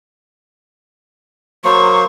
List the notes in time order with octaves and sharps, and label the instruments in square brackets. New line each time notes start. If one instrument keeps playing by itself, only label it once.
[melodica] F#3 A#3 C5 [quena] C#6